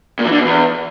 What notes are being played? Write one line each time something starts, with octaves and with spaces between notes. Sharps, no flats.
A#2
E3
D3
B2
E2